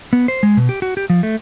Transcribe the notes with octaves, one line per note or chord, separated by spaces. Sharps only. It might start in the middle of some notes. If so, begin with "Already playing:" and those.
B3
C5
G#3
B2
G4
F#4
G4
F3
A3